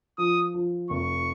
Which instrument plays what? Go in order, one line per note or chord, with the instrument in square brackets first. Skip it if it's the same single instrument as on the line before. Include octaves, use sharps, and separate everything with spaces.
[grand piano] F3 [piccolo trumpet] D#6
[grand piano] F3
[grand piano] F1 [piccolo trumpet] C#6